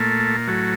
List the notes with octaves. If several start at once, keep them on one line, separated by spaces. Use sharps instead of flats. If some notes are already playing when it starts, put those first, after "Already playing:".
Already playing: A#2 A3
A2 F#3